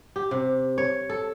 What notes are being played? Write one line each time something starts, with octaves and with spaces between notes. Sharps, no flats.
G4
C3
C#5
A4